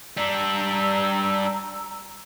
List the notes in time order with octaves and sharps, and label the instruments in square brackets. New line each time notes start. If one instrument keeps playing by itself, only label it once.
[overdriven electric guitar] G3 D4 [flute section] A#5 E6